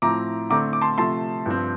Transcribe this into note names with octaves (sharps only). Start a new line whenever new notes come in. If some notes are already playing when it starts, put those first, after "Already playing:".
A2 F3 C4 E4 A#5 D6
D3 A3 C4 A#5 D6
D6
A5 C6
C3 F3 A3 A5 C6
G2 F3 C4